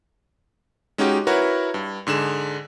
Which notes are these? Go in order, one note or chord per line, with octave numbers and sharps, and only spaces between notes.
G#3 C#4 D#4 F#4 G4
E4 F#4 A#4 B4 C#5 A#5
G2
G#2 D3 G#4 E7